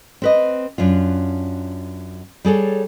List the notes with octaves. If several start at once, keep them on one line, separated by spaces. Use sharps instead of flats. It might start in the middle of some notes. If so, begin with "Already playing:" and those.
C4 B4 D#5
F#2 D4 F4
G3 G#4 A4 C#5